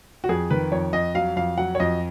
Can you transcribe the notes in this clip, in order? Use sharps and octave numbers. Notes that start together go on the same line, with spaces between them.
F#4
F2 G#4
D#3 B4
F2 C#5
F2 D#5
F#3 F5
F2 F5
F#3 F#5
C#5
F2 D#5